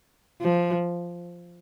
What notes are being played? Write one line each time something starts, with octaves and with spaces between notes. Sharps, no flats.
F3